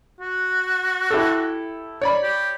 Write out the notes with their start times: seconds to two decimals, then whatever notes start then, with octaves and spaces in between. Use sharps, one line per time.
0.20 F#4
1.11 E4 G4 A4
2.01 C#5 D5 B5
2.23 G4